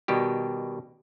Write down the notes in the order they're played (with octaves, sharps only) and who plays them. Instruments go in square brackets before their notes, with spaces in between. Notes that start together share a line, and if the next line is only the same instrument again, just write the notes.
[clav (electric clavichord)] B2 D#3 G3 G4